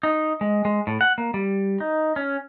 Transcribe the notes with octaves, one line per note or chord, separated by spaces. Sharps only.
D#4
G#3
G#3
A2
F#5
A#3
G3
D#4
C#4